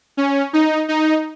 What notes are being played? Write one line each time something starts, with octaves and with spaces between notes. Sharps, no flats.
C#4
D#4
D#4